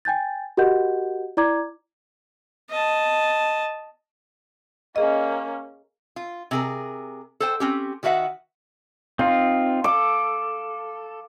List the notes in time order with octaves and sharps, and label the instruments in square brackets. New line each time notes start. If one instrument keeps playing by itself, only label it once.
[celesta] G5 G#5 G6 A6
F#4 G4 A#4 D#5 F#5 G6
E4 D5 A#5 D6 G#6
[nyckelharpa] D#5 A5
[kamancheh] A#3 C#4 [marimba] G#4 D#5
[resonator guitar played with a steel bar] F4
C3 G#4 A#4
A4 C5 G5
C4 C#4 G4
D#3 F#4 B4 E5 F#5
[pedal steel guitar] C4 D#4 F4 [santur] F5
[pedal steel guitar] A4 [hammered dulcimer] D6